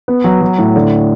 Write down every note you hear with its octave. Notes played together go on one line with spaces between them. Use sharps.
B3
F#3
F#3
A2
D3